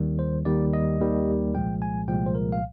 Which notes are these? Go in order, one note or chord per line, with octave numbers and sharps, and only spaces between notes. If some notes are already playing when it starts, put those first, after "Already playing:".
Already playing: D#2 D#3 G3
C5
D#2 D#3 G3 D5
D#5
D#2 D#3 G3
C2 A#2 F3 G#3 G5
G#5
C2 A#2 F3 G#3 G5
C5
A#4
F5